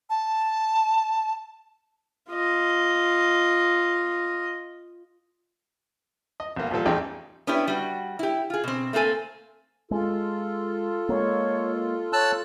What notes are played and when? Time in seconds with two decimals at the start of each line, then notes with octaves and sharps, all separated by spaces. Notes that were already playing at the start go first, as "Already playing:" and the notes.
0.10 A5
2.30 F4 D#5
6.40 D#5
6.56 B1 A#3
6.71 A#2 F3 G3 A4
6.85 A1 E2 D#4 G#4 G5
7.47 B3 C#4 D4 E4 G4 B4
7.68 G3 F#4
8.19 E4 G4
8.50 F4 G#4
8.64 B2 C4
8.93 A3 A#3 C4 A4 G#5
9.91 G#3 F4 A4
11.09 G#3 A#3 C#5
12.13 C#5 A5 E6 F#6